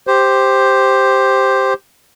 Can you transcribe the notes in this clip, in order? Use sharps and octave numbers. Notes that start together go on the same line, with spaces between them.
G4 C5